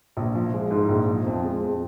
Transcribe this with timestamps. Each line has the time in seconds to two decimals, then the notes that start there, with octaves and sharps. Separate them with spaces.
0.17 A#1
0.35 F3
0.54 G#3
0.71 G#2
0.89 A#1
1.07 F3
1.26 F2
1.45 G#3
1.62 F2